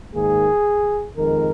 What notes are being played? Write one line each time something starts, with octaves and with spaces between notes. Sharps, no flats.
G#2 D#3 A#3 G#4
F2 D#3 G#3 A#4